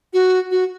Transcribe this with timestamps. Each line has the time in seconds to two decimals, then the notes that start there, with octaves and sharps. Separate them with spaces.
0.13 F#4
0.51 F#4